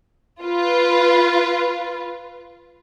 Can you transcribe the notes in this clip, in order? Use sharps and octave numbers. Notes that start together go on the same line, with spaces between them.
F4 B4